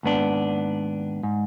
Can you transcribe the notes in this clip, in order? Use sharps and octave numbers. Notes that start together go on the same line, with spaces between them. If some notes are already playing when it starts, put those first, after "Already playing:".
D#2 G#2 B3 D4
G#2